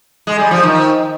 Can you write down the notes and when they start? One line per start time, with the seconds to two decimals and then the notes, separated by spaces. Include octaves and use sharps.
0.27 G#3
0.39 G3
0.51 F3
0.63 D#3